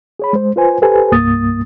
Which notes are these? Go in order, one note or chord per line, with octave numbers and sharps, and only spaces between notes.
G#4 C#5 B5
G#3 C5
F4 B4 C5 G#5
G4 A4 B4 C5 G#5
C2 G2 A#3 D#6 A6